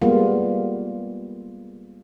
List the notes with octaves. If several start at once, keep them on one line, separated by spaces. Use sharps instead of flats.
G3 G#3 A#3 B3 F4